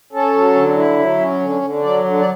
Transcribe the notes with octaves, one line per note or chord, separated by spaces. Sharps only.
C#4 A4
F#3
D3
E4
F#3
C#4
D3
D3
F#3 D5
D3
D5